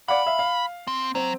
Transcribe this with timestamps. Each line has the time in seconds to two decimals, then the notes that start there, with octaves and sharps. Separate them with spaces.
0.08 D5 F5 F#5 B5
0.26 E5 F5
0.39 F5
0.87 C4
1.15 F#3 C4